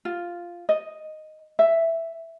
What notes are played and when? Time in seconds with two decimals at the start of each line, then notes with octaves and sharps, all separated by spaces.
0.05 F4
0.69 D#5
1.59 E5